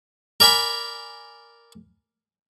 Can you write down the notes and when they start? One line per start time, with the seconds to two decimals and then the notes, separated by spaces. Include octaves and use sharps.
0.40 A#4 D5 G#5 B5